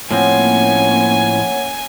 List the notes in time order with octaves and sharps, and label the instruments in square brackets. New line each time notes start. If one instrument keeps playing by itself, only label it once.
[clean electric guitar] A2 F3 C4 [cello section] A#3 C#4 [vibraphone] C#5 F#5 [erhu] G#5